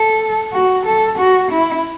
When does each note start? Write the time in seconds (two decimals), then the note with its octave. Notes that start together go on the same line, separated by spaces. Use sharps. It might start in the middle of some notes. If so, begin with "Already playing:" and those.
Already playing: A4
0.53 F#4
0.86 A4
1.18 F#4
1.51 E4